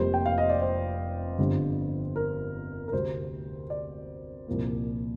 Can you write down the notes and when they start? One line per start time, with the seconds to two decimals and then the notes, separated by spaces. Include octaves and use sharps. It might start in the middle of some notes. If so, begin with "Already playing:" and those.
Already playing: F1 F2 C3 G3 A#3 C5
0.14 G5
0.26 F5
0.38 D#5
0.49 D5
0.62 C5
1.38 G1 F2 D3 G3
2.16 A#4
2.88 A#4
2.93 D2 C3 G3 C4 C5
3.70 D5
4.48 C2 A#2 F3 A#3